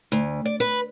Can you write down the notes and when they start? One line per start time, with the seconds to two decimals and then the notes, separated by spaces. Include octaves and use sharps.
0.12 D2
0.45 D5
0.60 B4